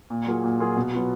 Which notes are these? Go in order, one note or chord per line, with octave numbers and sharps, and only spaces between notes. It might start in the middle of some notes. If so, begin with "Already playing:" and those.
A#2
F#3 A#3 F4 G#4
A#2
F#3 A#3 F4 G#4
B2
F#3 B3 F4